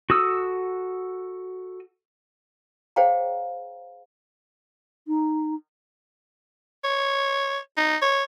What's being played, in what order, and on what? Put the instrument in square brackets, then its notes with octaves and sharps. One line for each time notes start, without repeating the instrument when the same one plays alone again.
[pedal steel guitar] F#4 A4 D#6 E6
[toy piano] G#4 C5 C#5 F5 G5 A#5
[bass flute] D#4
[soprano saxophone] C#5
D#4
C#5